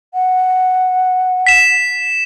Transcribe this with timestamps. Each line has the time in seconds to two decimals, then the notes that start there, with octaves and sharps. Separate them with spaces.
0.14 F#5
1.47 B6 E7